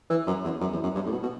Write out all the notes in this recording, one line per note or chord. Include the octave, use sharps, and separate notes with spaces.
E3
F#2
E2
F#2
E2
F#2
G2
A2
B2
B2